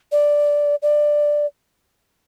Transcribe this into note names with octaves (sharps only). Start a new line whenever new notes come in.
D5
D5